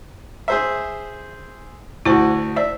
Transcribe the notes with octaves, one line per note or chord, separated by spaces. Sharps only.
G#4 C5 E5
D2 E4 F#4 C5 A5
C5 D5 E5